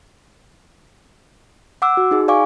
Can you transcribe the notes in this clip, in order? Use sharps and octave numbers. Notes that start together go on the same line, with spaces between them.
F#5 D6 E6
F#4
D#4 G#4
D5 F5 G#5 C#6 D6